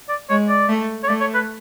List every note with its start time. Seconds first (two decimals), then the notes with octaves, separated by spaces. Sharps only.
0.09 D5
0.30 G#3 C#5
0.49 D5
0.69 A3
1.03 C#5
1.08 A3 D5
1.21 C#5
1.34 B4